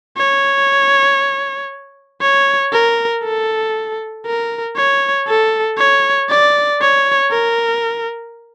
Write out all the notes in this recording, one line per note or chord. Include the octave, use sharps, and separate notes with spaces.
C#5
C#5
A#4
A4
A#4
C#5
A4
C#5
D5
C#5
A#4